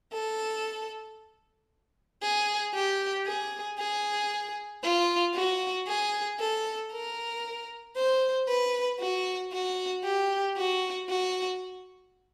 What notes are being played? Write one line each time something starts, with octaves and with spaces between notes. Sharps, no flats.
A4
G#4
G4
G#4
G#4
F4
F#4
G#4
A4
A#4
C5
B4
F#4
F#4
G4
F#4
F#4